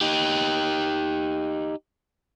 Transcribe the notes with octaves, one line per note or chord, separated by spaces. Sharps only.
D#4 G4